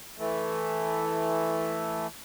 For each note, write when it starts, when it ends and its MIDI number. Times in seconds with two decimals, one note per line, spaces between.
0.19 2.07 52
0.19 2.07 57